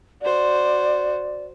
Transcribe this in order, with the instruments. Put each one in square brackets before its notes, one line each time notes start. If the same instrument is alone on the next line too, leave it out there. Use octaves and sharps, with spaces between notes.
[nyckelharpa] F#4 C5 [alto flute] D5